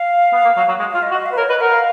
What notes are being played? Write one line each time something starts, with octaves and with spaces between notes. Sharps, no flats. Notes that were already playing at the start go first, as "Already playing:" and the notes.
Already playing: F5
B3
A#3
F#3
F#3
G#3
F4 F5
D#5
F#4
D#5
F5
B4
A#4 C#5
B4 D#5
A#4 F#5
F5